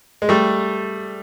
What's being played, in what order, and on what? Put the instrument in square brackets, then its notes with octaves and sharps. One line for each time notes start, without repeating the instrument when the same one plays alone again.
[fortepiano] G#3
G3 A3